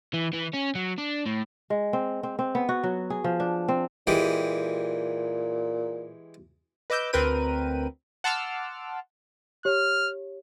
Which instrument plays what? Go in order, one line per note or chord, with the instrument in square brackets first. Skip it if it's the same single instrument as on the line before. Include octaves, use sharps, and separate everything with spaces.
[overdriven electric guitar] E3
E3
C#4
F#3
D4
A2
[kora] G#3
C4
C4
C4
B3
F#4
F#3
G#4
F3
D4
C4
[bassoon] A#2 [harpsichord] E3 G#3 G4
[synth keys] B4 D#5 D6 E6 G6
D2 C4 A#4 B4 G5 D#7
F#5 A5 C6 D6 E6 F6
[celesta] G4 C#5 [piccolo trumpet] F6